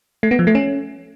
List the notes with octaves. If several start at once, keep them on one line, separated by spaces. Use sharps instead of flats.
A3
B3
F3
A3
C#4